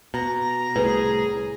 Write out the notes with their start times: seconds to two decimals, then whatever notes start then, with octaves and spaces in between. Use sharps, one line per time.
0.14 B2 A#5
0.76 C2 A2 G#4 B4